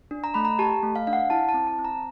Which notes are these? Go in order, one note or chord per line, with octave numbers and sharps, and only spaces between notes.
D4
A#5
A3 B5
A#5
G4 A5
A3
F5
D4 F5
F#5
E4 A5
A5
C4
A5
C4
A#5